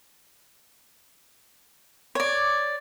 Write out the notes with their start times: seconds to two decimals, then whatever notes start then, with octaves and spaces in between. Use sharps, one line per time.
2.15 C#5 D5